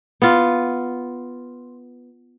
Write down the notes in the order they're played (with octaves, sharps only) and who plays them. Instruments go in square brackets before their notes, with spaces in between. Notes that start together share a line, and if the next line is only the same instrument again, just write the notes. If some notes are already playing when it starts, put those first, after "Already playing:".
[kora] B3 F4